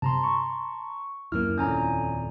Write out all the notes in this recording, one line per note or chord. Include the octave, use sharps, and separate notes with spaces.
G2 C3 A5 A#5 C6
C#6
D1 F#2 A#3 E4 F6
D#1 F2 D3 C#4 G#5 A#5